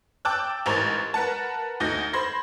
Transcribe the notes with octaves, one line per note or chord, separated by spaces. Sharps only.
G5 A5 D6 E6 F#6
A1 G#2 A#4 C5 C#6 F7
A#4 B4 F#5 A5
D2 D#4 G6 A#6
C5 B5 C6 G#6 A#6